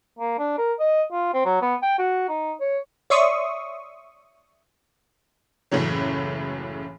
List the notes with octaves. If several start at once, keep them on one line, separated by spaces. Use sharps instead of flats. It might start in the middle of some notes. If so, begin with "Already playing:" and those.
A#3
D4
A#4
D#5
F4
C4
F#3
B3
G5
F#4
D#4
C#5
C#5 D5 E5 C6 C#6 D#6
F#1 A2 C#3 E3 F#3